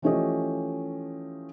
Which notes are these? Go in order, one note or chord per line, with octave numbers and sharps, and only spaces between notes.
E3 F3 A3 C#4 G4 D#5